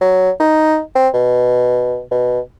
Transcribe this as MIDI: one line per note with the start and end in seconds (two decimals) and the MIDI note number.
0.01 0.31 54
0.40 0.81 63
0.95 1.09 60
1.14 2.01 47
2.11 2.40 47